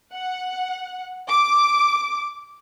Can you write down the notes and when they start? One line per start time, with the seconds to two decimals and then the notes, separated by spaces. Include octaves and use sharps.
0.13 F#5
1.28 D6